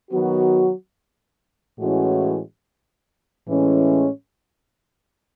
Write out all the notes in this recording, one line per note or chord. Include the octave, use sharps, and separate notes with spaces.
D#3 F#3 B3 F#4
A2 E3 G#3 C#4 F#4
A2 E3 G#3 C#4